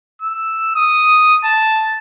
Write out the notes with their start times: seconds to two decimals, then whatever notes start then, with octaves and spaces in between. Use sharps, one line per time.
0.22 E6
0.76 D#6
1.45 A5